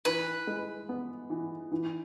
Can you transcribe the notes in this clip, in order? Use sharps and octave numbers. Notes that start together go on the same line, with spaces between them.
E3 B4
G#3
B3
E3
E3